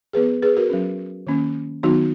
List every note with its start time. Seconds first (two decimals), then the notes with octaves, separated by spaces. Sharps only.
0.13 F3 B3 G#4 B4
0.42 G#4 B4
0.57 F#4 A#4
0.70 F#3 C#4
1.27 D#3 A#3 C#4
1.83 D#3 F#3 B3 D#4 F#4